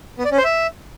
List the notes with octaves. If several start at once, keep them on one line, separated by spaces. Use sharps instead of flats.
B3
D5
C#4
C5
E5